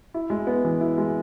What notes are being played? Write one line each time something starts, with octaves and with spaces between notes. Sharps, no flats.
E4
G#3
B3
E3
E4
G#3